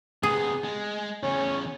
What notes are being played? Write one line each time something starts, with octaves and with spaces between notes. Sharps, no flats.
C3 B3 G#4
G#3
E2 C#3 C#4